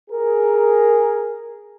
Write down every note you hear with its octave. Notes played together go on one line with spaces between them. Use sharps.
G#4 A#4